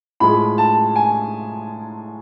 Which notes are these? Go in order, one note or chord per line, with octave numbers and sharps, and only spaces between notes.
A2 F3 G#3 B5
A5
G#5